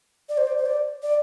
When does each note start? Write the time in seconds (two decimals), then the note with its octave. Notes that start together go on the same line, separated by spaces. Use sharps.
0.29 D5
0.38 C5
0.47 D5
0.58 C5
0.66 D5
1.03 D5